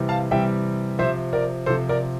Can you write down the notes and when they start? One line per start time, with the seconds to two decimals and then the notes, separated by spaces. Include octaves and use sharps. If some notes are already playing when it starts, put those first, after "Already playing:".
Already playing: C3 E3 G3
0.09 F5 A5
0.31 C3 E3 G3 E5 G5
0.99 C3 F3 C5 E5
1.33 A#4 D5
1.66 C3 A4 C5
1.70 F3
1.89 A#4 D5